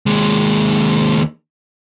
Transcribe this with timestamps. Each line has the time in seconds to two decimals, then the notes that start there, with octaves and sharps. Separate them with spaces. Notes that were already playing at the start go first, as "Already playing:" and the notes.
0.06 D#2 G#3